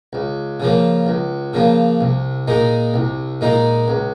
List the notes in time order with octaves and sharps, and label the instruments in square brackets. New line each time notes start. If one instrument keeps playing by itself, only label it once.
[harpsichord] C#2
C#3 F3 A#3
C#2
C#3 F3 A#3
C2
A#2 G#3 D#4
C2
A#2 G#3 D#4
C#2